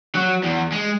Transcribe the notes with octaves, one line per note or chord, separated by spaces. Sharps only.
F#3
E2
G#3